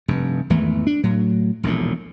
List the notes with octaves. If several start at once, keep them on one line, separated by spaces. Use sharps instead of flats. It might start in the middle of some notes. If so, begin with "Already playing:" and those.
F1 G2
G#1 E2 E3 A3
D4
A2 F#3
E1 A#1 D#2 A2